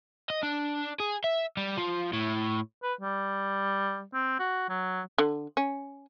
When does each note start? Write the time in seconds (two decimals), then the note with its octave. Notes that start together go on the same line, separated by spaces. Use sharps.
0.30 D#5
0.43 D4
1.00 G#4
1.24 E5
1.57 G3
1.77 F3
2.13 A2
2.83 B4
3.01 G3
4.14 C4
4.39 F#4
4.69 F#3
5.18 D3
5.57 C#4